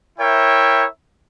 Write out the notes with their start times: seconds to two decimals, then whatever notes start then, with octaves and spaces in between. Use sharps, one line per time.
0.18 E4 A#4 C#5 E5 G5